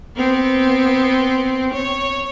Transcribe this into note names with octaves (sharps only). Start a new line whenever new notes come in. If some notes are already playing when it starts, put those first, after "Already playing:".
B3 C4
C#5